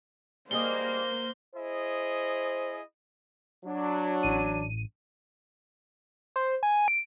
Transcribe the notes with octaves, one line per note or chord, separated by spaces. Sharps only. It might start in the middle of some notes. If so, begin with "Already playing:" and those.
G3 A#3 G#4 C5 D#5 G7
E4 G#4 C5 D#5
F#3 D4
A1 D#7
C5
G#5
D7